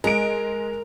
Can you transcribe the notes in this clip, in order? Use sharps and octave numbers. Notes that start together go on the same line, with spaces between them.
G#3 A#4 D7